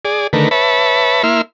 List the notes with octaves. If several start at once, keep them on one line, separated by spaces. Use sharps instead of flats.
G#4 D5
D3 D#3 A3 A#4 B4
B4 C#5 E5 A5 B5
A#3 E4 E5 C6 F6